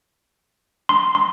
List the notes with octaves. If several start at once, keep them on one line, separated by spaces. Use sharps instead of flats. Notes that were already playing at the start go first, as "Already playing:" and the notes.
C6
C6